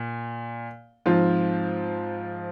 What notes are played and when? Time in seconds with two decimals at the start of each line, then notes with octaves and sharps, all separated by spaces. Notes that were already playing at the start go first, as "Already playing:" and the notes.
Already playing: A#2
1.06 G#2 F3 C4 F4